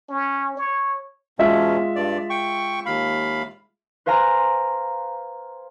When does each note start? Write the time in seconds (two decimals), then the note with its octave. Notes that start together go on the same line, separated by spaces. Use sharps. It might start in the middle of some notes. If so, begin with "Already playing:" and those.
0.10 C#4
0.57 C#5
1.39 E2 B2 G#3 C#4 F4 E5
1.96 G2 D5
2.30 G5 C#6
2.86 D#2 F5 B5
4.06 B4 C5 F5 G#5 A#5